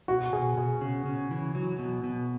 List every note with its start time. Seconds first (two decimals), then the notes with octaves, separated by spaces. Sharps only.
0.08 B2 F#4
0.33 B2 G#4
0.57 B2 G#4
0.81 C#3
1.06 C#3
1.31 E3
1.55 F#3
1.79 B2
2.04 B2